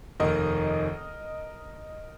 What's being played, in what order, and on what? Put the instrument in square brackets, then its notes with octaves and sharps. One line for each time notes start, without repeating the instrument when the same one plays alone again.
[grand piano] F1 D#2 D#3 A#3 A#4 D#5